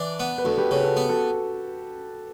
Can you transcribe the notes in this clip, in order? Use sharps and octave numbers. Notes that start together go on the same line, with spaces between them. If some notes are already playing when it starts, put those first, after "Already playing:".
Already playing: E3 D4 B4
B3
B4
D2 F#4 A4
G4 B4
C#3 F#4 A4
B4
F#4 A4
B3
F#4 A4